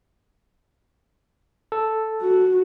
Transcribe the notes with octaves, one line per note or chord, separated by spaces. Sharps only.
A4
F#4